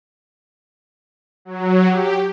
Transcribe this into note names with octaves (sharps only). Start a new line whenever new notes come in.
F#3
G4